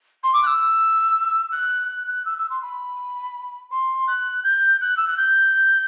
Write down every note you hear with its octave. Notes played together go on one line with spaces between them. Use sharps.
C6
D6
F#6
E6
F#6
F#6
F#6
E6
E6
C6
B5
C6
F#6
G6
F#6
E6
F#6
G6